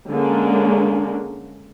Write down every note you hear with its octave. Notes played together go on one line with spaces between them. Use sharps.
D3 G#3 A#3 C#4 D4